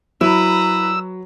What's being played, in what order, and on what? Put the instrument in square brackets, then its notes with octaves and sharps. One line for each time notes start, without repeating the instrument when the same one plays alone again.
[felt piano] F#3 [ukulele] E4 [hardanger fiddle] B4 A#5 [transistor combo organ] E6